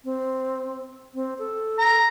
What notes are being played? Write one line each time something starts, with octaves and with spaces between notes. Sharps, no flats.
C4
C4
A4
A#5